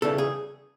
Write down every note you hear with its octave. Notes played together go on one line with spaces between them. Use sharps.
E2 C#3 E3 G3 A4
G#4